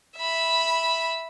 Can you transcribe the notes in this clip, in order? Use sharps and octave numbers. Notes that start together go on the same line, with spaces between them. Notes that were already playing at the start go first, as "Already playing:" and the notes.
E5 B5